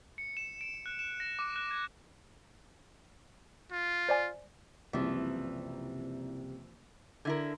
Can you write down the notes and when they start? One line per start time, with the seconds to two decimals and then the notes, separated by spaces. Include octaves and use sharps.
0.18 C#7
0.37 E7
0.61 D7
0.86 F#6
0.99 E7
1.20 A#6
1.39 D6
1.56 F#6
1.71 G#6
3.71 F4
4.09 C5 D5 G#5
4.93 F#1 C2 C3 E3 F3
7.25 D3 E4 A#4 G#6